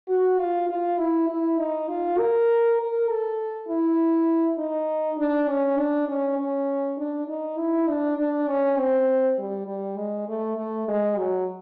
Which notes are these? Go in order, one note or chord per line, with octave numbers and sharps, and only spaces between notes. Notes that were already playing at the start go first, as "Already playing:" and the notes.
F#4
F4
F4
E4
E4
D#4
F4
A#4
A#4
A4
E4
D#4
D4
C#4
D4
C#4
C#4
D4
D#4
E4
D4
D4
C#4
C4
G3
G3
G#3
A3
A3
G#3
F#3